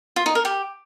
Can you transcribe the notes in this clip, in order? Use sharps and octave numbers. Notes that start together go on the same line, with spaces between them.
F4
D#4
A#4
G4